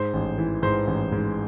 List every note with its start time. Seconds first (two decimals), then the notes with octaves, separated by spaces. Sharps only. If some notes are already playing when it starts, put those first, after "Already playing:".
Already playing: G#2 C5
0.13 A1
0.38 E3
0.63 G#2 C5
0.87 A1
1.12 G#2